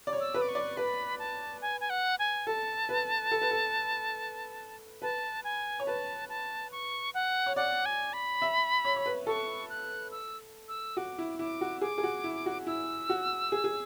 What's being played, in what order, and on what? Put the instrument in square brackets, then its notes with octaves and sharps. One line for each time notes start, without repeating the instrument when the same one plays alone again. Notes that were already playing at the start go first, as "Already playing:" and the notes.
[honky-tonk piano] D5
C#5
[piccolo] E6
[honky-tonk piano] B4
[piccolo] D6
C#6
[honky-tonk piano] D5
[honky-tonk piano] B4 [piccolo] B5
[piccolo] A5
G#5
G#5
F#5
G#5
[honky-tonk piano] A4 [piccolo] A5
[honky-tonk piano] B4
A4
B4
A4
[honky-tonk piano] B4 [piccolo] A5
[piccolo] G#5
[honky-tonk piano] C#5
[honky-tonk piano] B4 [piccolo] A5
[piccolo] A5
C#6
F#5
[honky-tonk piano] C#5
[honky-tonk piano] D5 [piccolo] F#5
[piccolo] G#5
B5
[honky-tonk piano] E5
C#5
C#5
B4
[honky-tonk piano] A4 [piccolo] C#6
[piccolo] F#6
E6
E6
[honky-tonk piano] F#4 [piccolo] D6
[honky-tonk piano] E4
[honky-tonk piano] E4 [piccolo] D6
[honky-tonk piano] F#4
[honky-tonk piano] G#4 [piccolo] D6
[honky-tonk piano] G#4
F#4
E4
F#4
[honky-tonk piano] E4 [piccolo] E6
[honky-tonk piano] F#4
G#4
G#4